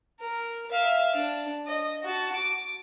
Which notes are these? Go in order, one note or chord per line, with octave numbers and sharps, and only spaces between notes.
A#4
E5 F5
D4
D#5
F#4 A5
D6